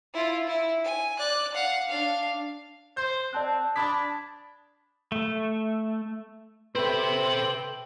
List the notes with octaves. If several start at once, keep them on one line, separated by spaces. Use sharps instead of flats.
E4 F4
E4
G#5
D5 F#6
F5 F#5
D4 F5
C5 G6
C4 D5 A5 F#6
D4 A5 B5 D#6 G#6 B6
A3
A4 B4 C5 E5 G5 C6 F#7